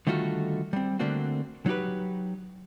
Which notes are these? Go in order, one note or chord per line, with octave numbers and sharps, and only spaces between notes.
D3 D#3 G3 A3 F4 F#4
G3 C4
D3 A3 A#3 C4 D4 F#4
F#3 D#4 F#4 G4 B4